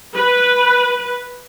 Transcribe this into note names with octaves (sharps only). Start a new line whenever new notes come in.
B4